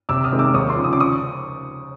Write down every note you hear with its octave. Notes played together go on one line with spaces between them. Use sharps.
C3 D6 E6
D#6 F6
D#3 G#3 C4
D6 E6
D#2 C#6 D#6
C6 D6
C#3 F3
D#6
D6
C#6 D#6